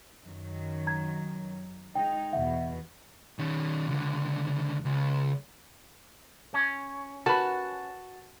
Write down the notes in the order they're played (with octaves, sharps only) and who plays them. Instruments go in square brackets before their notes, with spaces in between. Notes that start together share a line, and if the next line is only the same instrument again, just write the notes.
[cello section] F#2 D#3 F#3
[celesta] A#5 G#6
[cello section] G#3 D#4 [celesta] G5
[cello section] E2 B2 [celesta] E5 F#5
[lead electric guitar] D#3 C#4
C#2 D3
C#2
[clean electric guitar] C#4
[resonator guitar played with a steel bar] F#4 [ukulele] A#4 B4 B5 [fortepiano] A5